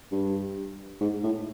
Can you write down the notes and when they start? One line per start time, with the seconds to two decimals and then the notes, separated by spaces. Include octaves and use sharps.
0.12 G2
1.01 G#2
1.23 A2